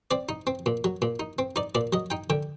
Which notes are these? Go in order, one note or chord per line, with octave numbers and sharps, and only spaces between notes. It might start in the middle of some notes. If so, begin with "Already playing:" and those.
C4 D5
D#4
C4
A#2
F#3
A#2
D#4
C4
D#4 D5
A#2 D5
F#3 D#5
D#4 G5
D3 G5